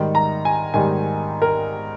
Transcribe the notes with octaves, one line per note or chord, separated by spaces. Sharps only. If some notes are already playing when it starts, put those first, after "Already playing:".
Already playing: G#2 D#3 G3
A#5
G#5
G#2 D#3 G3 G#5
A#4